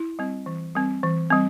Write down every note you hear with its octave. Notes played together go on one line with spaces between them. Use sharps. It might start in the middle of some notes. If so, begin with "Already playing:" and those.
Already playing: E4
G3 C4
E3
G3 C4
E3
G3 C4